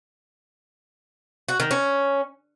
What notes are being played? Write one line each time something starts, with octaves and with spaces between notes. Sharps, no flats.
F#4
D#3
C#4